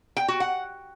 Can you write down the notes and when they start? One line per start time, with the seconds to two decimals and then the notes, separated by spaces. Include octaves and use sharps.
0.17 G5
0.28 F#4
0.40 F#5